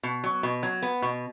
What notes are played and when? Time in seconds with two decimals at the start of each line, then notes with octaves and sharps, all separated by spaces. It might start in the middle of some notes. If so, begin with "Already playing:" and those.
0.03 B2
0.24 F#3
0.43 B2
0.63 F#3
0.82 B3
1.02 B2